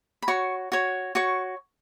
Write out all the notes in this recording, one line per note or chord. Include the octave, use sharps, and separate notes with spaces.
B5
F#4 C#5 C#6
F#4 C#5
F#4 C#5 C#6